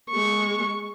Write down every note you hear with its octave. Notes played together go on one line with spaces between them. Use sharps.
G#3 C#6